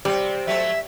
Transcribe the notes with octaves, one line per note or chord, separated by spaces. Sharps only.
C3 G3 C4
F#3 A3 C4 E5